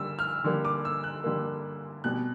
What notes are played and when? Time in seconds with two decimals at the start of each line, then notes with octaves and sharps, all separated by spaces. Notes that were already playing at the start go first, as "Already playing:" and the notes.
Already playing: D3 G3 A#3 E6
0.19 F6
0.44 D3 G3 A#3
0.65 D6
0.85 E6
1.04 F#6
1.24 D3 G3 A#3
2.04 B2 G3 C4 F#6